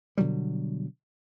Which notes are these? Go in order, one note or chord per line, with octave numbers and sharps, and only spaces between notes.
B2 D3 F#3 G3